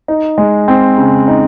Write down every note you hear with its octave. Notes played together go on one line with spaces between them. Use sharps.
D#4
G#3
C4
C#3
D#4